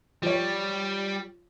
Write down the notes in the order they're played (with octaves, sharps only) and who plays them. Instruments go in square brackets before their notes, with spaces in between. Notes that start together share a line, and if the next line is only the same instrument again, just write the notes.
[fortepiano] F3 C#5 [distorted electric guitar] G3